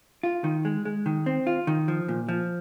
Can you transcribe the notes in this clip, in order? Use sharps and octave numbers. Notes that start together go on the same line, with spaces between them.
F4
D#3
G#3
G#3
D#3
C4
F4
D#3
F3
A#2
F3